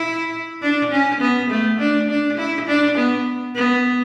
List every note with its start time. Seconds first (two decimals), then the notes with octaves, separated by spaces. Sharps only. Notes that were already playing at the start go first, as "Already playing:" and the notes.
Already playing: E4
0.62 D4
0.91 C#4
1.21 B3
1.50 A3
1.79 D4
2.10 D4
2.38 E4
2.67 D4
2.97 B3
3.55 B3